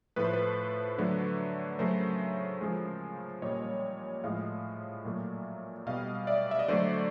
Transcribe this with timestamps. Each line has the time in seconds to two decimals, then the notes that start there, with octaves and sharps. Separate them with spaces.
0.16 A2 F3 A3 B4
0.24 C5
0.33 B4
0.98 D3 F#3 A3
1.79 C#3 F#3 A3 A#4 C5
2.61 C#3 F3 G#3
3.42 A#2 G3 C#5 D#5
4.24 A2 F3 G#3 D#5 F5
5.05 A#2 F#3 A3
5.87 B2 G3 D#5 F5
6.27 D5 E5
6.51 E5
6.59 D#5
6.68 D3 F#3 A3 C5 D5